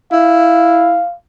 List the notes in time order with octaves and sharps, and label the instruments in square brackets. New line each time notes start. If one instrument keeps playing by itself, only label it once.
[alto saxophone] E4 [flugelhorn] F5